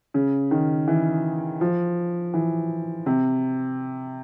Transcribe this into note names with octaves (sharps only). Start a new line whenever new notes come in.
C#3
D#3
E3
F3
E3
C3